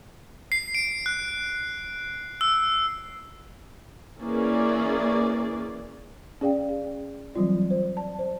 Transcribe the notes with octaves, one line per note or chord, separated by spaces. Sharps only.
C7
D7
F#6
E6
E3 A#3 C#4 G#4 D5
C#4 G#4 D5 F5 G5
G#4
E3 F#3 G3 C4 F4 D5
C5
D5 A5
C5